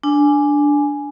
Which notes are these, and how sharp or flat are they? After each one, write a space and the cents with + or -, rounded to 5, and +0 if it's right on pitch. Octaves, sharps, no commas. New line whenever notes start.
D4 +0 G#5 +5